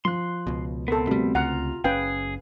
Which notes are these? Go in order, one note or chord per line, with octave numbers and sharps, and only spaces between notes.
F3 C6 F#6
C#2 B2
B3 C4 A4 A#4
D2 C3 G3 A3
C#2 F4 F#5 A#5 F6
F#1 C#4 G#4 B4 F5 G5